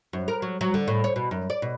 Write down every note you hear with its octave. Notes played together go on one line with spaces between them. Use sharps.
F#2
A#4
F#3
F#3
D3
A2
C#5
B2
F#2
D5
B2